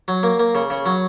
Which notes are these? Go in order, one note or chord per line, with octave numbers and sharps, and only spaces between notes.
F#3
A#3
A#3
C#3
C#3
F#3